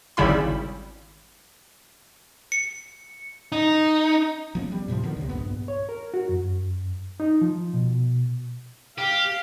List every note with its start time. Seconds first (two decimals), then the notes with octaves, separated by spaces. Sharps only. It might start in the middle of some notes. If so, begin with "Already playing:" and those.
0.17 G#1 C#3 G3 E4 B5
2.52 C#7
3.52 D#4
4.55 F3 B3 C#4
4.72 G3
4.88 A2 C3 D#3 F3
5.03 D3 D#3 F3 B3
5.17 C#2 C3
5.29 A#1 G2 B3
5.68 C#5
5.89 A#4
6.14 F#4
6.29 F#2
7.20 D#4
7.41 F3
7.74 B2
8.98 G4 F5